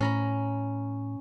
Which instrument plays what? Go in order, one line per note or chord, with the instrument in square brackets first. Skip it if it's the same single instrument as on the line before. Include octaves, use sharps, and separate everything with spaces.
[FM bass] A2 [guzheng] C#4 A#5 B5